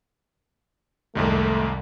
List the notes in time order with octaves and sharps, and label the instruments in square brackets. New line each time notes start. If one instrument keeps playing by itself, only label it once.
[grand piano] C2 [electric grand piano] F2 G#2 D#3 [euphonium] A3